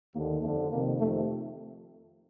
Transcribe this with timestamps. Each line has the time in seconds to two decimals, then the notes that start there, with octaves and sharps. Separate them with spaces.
0.14 D#2 D3 A#3
0.42 F2 D3 A3
0.71 F2 C3 D#3 A#3
1.00 F2 C3 D#3 A3